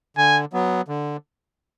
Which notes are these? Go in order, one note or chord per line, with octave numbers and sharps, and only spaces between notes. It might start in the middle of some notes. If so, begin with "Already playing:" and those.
D3 G#5
F#3 B3
D3